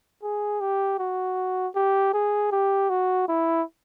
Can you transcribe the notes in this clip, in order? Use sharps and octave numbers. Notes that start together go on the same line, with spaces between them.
G#4
G4
F#4
G4
G#4
G4
F#4
E4